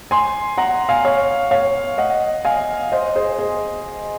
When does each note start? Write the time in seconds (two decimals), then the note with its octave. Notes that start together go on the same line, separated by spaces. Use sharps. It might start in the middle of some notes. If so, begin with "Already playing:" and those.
0.11 G#5 C6
0.58 F#5 A#5
0.89 F5 G#5
1.05 C#5 F5
1.51 C#5 F5
1.98 D#5 F#5
2.45 F5 G#5
2.92 C5 D#5
3.16 G#4 C5
3.39 G#4